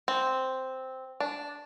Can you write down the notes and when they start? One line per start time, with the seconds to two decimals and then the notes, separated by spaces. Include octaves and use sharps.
0.08 C4
1.20 D4